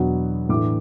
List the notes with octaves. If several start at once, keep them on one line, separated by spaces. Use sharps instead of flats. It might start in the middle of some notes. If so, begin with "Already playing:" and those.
Already playing: E2 B2 F#3 B3 D4 F#5
A2 E3 A3 D4 D6